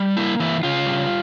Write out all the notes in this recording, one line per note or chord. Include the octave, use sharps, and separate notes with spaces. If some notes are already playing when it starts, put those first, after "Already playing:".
Already playing: G3
A#3 E4
E3 E4
C#3 F4
G3